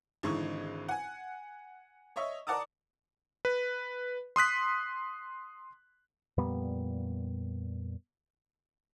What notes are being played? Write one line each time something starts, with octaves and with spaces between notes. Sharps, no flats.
G#1 D3 E3 G#3 D#4 C#6
F#5 G#5
C#5 D#5 E5 C#6
A#4 D5 F#5 A5 D6 D#6
B4
C6 D#6 F#6 B6
F2 A#2 G3 B3